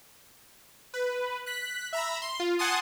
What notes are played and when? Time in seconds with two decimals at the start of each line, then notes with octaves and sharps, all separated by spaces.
0.94 B4
1.46 F#6 B6
1.93 E5 A#5 B5
2.22 C6
2.40 F4
2.59 F#5 G#5 A5 C6 D#6